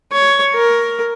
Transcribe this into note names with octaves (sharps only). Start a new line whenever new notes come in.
C#5
A#4